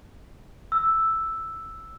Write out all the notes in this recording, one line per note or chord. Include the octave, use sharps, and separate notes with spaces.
E6